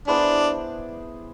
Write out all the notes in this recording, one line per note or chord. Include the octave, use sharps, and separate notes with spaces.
B3 D4 E4 G#4 C5